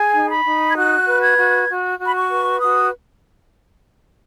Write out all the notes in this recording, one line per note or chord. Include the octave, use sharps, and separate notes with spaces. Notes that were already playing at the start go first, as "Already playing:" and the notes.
Already playing: G#4 G#5
D#4
B5
D#4
G#6
F#4 F#6
B4
G#6
F#4
F#4
F#4
B5
C#6
B4
F#4 D#6